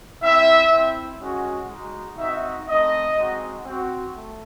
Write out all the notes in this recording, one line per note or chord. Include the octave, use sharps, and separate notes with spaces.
C4 E4 E5
C4 E4
G#3 C#4 F#4
G#3 D#4 F#4
C4 D#4 F#4 E5
A3 C4 D#4 D#5
G#3 C4 D#4 F#4
C4 F#4
A3